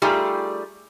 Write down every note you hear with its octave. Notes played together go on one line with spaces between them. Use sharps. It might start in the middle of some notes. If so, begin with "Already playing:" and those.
G3 A3 D#4 F4 G4 G#4